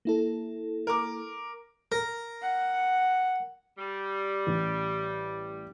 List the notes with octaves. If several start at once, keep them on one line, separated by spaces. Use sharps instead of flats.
A#3 E4 A4
A#4 D6
A#4
F#5
G3
A1